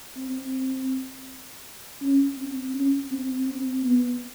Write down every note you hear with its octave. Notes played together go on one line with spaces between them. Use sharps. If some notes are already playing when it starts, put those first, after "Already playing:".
C4
C#4
C4
C#4
C4
C4
B3